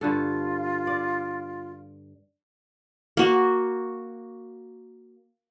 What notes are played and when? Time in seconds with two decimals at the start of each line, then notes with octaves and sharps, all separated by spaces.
0.01 G2 D3 F4 A4
0.87 D5
3.17 A#3 F#4